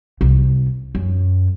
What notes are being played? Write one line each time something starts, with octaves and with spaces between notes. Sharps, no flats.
C2
F#2